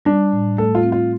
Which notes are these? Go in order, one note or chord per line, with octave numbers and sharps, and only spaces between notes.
G3 D4
A2
A3 A4
F4
C4
F4